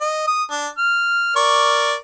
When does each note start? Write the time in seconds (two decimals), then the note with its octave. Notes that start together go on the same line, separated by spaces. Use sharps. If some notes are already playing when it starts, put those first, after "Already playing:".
0.01 D#5
0.27 D#6
0.51 D4
0.78 F6
1.36 A#4 D5 C#6